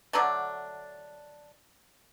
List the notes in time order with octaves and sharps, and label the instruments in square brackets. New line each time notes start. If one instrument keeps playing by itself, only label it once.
[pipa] D3 F#3 A3 D4